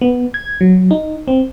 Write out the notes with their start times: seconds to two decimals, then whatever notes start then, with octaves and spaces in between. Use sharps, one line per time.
0.01 B3
0.34 G#6
0.61 F#3
0.91 D#4
1.28 C4